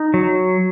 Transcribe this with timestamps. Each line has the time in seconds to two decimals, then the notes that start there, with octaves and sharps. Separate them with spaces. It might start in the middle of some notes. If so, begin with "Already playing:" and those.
Already playing: D#4
0.14 F#3